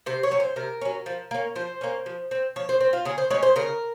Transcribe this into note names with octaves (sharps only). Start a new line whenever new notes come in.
C3 C5
C#5
F#3 C#4
C5
C3 A#4
F#3 C#4
F3
A#3 C#4
F3 C5
A#3 C#4
F3
C4
F3 C#5
C5
C4 C5
F4
C#3 G#4
C5
G#3 C#4 C#5
C5
C#3 A#4